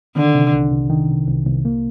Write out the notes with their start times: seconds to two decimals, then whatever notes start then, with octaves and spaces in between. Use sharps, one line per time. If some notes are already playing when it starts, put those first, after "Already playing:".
0.16 D3 D#3
0.35 C3
0.53 C2
0.71 C2
0.90 D#3
1.09 C3
1.28 C2
1.46 C2
1.65 A#3